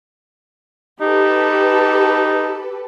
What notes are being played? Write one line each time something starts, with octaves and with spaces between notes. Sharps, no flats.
D#4 G4 A4 B4